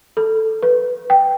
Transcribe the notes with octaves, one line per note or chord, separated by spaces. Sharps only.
A4
B4
G5